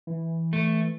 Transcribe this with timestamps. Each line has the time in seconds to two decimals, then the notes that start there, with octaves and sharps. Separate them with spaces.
0.07 E3
0.53 A3